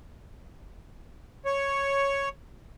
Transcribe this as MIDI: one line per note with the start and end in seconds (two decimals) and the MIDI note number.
1.46 2.29 73